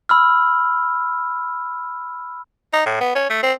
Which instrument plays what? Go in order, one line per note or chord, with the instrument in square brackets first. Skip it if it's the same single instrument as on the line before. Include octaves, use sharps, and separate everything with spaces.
[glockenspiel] B5 E6 F6
[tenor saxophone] D#4
A2
B3
C#4
A3
C4